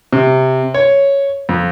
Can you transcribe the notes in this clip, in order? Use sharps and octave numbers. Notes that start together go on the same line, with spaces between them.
C3
C#5
F2